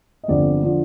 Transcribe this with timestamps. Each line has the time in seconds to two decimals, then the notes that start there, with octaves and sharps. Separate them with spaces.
0.24 D#5
0.28 G1 F2 D3 F3 D5
0.63 D3 F3